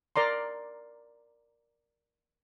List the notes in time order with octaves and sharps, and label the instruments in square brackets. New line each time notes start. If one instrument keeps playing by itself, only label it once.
[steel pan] A#4 D5 A#5 C6